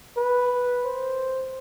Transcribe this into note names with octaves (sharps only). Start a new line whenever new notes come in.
B4
C5